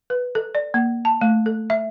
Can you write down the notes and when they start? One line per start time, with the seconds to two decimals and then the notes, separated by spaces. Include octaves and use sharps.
0.10 B4
0.35 A4
0.55 D5
0.74 A#3
1.05 A5
1.21 A3
1.46 A4
1.70 E5